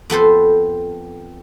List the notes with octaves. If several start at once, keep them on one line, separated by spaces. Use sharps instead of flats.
F2 B3 A4 C5